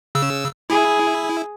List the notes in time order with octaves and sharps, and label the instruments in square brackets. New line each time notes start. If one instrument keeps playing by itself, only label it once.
[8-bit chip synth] C#3 E6
[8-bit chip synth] E4 [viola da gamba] G#4